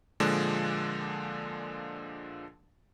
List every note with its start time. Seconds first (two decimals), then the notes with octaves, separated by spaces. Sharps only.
0.20 A#2 D3 F3 G#3 D4